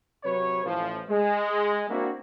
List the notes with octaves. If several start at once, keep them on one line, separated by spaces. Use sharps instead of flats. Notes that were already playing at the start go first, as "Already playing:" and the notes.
C3 F#3 B4 C#5
A1 F3
G#3
A#3 C4 D4 E4 F#4